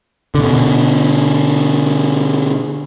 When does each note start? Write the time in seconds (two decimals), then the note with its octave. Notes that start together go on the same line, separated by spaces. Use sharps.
0.35 B2 D3